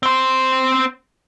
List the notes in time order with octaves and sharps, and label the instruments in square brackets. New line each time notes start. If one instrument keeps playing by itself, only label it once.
[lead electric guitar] C4 C5